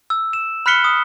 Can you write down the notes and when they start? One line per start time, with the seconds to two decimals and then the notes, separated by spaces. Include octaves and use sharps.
0.10 E6
0.33 E7
0.66 B5 F6 F#6 B6 C#7 G7
0.84 D#6